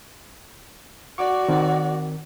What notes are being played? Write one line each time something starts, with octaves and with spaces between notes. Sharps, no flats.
F#4 D5 C#6 D6
D#3 C4 A#4